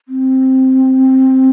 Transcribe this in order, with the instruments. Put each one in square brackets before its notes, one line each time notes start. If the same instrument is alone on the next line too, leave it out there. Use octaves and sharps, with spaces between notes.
[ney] C4